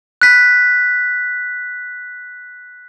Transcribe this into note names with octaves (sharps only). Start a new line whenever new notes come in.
F#6 B6